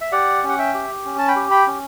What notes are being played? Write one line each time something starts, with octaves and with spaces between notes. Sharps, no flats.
E5
G4 D5 F#5
C#4
F#5
E5 G5
G4
C#4
A5
G5 B5
G4
G5 B5
C#4